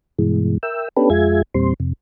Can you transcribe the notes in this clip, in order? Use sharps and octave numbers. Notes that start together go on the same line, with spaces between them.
G2 B2 E3 G#3
A#4 E5 G5 E6
B3 C#4 D4 G4 A4 B4
F2 G#3 F4 G#4 E5 G#6
E2 A#2 G3 C4 C6
F2 C3